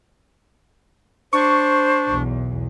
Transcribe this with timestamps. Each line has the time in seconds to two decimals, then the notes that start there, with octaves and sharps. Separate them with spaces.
1.33 D4 C5 C#6
2.10 B1 E2